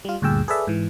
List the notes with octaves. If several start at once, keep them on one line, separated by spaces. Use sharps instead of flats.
G3 F4
D2 G2 A#2 G#4 G5 E6
G#4 A4 B4 D5 E5
G#2 E3